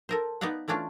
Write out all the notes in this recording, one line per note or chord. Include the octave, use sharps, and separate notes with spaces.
A4 A#4 C5
B3 D#4 D5 F5 F#5
E3 A3 C#4 D4 F4